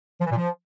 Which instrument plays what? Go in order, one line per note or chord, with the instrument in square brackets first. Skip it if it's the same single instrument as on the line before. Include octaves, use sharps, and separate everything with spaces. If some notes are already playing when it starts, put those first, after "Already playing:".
[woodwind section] F3
E3
A#2
F3